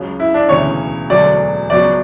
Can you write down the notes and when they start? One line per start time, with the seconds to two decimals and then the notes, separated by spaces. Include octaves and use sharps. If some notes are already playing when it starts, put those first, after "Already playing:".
Already playing: C#2 C#3 F#3
0.20 E4
0.34 D4
0.49 E1 D2 C#3 E3 C#5
1.10 E1 D2 D3 F#3 D5
1.70 C#2 B2 F#3 D5